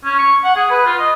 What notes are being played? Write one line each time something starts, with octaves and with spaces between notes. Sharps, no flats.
C#4
C#6
F#5
G#4
B4
F4
D#5